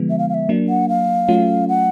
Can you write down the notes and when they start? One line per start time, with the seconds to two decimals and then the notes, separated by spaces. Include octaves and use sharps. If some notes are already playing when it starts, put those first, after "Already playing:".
Already playing: D3 F3 G#3 B3
0.10 E5
0.18 F5
0.29 F5
0.34 E5
0.49 F#3 A#3 D4
0.69 F#5
0.89 F5
1.28 F#3 A3 C#4 F4
1.68 F#5